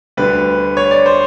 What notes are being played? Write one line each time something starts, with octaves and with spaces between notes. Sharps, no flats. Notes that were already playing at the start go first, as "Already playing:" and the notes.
D2 D3 G3 B4
C#5
D5
C5